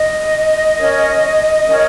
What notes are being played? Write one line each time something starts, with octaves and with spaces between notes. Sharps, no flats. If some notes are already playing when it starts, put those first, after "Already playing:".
Already playing: D#5
C#4 A#4 C#5
C#4 A#4 C#5